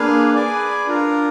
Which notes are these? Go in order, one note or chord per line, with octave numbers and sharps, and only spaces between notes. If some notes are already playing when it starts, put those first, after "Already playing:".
Already playing: A#3 D4 G#4 B4 F5
G#4 B4 D5 G#5
D4 F4 A#4